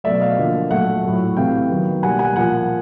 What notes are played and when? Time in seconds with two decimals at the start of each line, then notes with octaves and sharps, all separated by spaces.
0.04 B2 F#3 A3 D5 E5
0.21 D#5 F5
0.38 D3 F3 A#3
0.70 A#2 F#3 A3 E5 F#5
1.04 A2 F#3 A3
1.37 C3 E3 A3 F5 G5
1.70 D#3 F#3 B3
2.03 B2 G3 A#3 F#5 G#5
2.19 F#5 G#5
2.36 A#2 F3 A#3 F#5 G#5